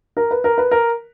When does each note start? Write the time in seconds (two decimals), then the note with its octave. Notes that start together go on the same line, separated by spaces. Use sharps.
0.17 A#4
0.31 B4
0.44 A#4
0.58 B4
0.71 A#4